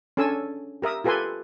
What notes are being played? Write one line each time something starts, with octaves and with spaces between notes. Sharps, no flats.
C#4 D4 A4 G#5 E6
G4 A#4 E5 D#6
F4 G4 A4 B4 G#5 C6